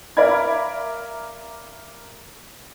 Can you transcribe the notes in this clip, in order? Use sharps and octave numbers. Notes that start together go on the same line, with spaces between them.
A#4 D5 E5 F5 B5 G#6